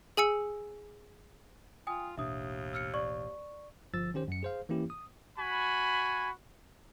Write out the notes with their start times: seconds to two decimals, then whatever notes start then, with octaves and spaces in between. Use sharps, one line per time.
0.17 G#4 G#5 E6 C#7
1.87 F4 G5 G#5 D#6
2.18 A1 D#2 B2 D4 E5 D#6
2.73 E6 F6 C#7
2.94 D5 C#6
3.94 G1 F3 E6 A6
4.14 D#3 C#4 G4 C5
4.28 F#2 C#7
4.43 G#4 C5 F5
4.69 E3 A#3 C#4 E4 G4
4.90 D#6
5.37 F#4 G#5 B5